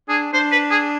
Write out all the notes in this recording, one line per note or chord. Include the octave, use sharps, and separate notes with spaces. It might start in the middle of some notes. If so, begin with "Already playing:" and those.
D4 G#4
D4 C5
B4
G#4